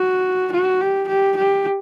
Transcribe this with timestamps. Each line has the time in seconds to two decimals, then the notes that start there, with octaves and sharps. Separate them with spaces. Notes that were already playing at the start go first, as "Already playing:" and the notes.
Already playing: F#4
0.52 F#4
0.81 G4
1.08 G4
1.36 G4